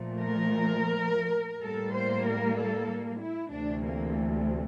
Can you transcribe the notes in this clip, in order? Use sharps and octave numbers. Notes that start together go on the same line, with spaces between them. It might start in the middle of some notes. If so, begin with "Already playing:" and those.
Already playing: A#2 F3 A3
A#4
A2 G3 A#3 A4
C5
A#4
A4
E4
D2 C3 E3 A3 D4
A#3